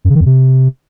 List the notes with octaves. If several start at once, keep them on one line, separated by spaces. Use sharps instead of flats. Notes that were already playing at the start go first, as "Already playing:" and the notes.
F#2
C#3
D#3
F2
C3